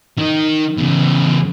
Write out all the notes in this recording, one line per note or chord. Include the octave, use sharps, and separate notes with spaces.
D#3 D#4
E2 C#3